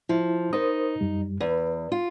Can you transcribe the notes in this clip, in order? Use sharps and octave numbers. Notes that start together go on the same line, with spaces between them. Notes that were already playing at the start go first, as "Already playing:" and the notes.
F3 E4
D#4 A#4 C5 D#6
F#2 G3
E2 B4
F4